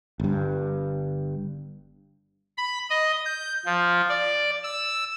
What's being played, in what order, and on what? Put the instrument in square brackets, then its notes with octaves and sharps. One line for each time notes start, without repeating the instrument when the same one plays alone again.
[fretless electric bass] G1 G2
[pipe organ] B5
D#5
G6
F3
D5
E6